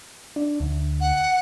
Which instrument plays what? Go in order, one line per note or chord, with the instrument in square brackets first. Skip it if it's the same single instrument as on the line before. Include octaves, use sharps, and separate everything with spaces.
[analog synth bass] D4
D2
[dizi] F#5